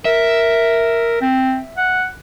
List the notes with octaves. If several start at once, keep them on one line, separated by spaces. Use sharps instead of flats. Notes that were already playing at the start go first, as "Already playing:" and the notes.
A#4 E5
C4
F#5